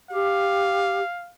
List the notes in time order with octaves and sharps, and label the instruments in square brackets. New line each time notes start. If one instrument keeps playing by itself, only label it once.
[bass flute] G4 [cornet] F5